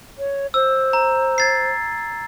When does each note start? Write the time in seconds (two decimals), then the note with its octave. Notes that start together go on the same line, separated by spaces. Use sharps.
0.18 C#5
0.54 C5 E6
0.93 A#5
1.38 G#6 A6 C7